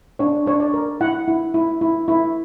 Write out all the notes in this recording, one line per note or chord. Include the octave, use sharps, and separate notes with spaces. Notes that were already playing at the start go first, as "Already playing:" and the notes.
D4 C#5
D4 C#5
D5
A#4
E4 F#5
E4
E4
E4
E4